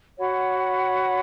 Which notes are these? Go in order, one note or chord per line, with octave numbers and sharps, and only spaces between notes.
F#4 C#5 F#5 B5